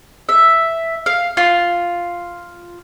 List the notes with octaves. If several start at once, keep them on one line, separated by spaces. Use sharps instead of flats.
E5
F5
F4